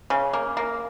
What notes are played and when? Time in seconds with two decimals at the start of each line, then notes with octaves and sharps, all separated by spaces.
0.10 C#3
0.33 A#3
0.57 A#3